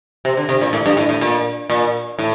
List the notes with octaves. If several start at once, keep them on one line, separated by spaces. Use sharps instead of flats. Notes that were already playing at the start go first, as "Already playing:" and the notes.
C3
D3
C3
A#2
A2
G2
A2
A2
A#2
A#2
A2